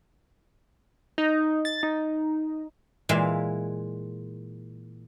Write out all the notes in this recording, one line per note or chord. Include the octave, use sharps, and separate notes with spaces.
D#4
A6
D#4
A#2 E3 G#3 A#4 E5 F5